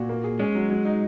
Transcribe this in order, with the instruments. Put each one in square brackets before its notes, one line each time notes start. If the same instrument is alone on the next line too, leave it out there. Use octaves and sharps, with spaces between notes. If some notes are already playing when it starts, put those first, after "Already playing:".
Already playing: [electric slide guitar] A#2 [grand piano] F#4
[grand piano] A#3
G#4
[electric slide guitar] G#3 [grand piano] C#4
[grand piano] F#3
F#3
D#4